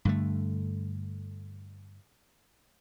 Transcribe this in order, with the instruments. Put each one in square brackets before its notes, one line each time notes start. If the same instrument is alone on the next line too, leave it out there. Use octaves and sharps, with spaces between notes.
[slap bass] G2 D3 A3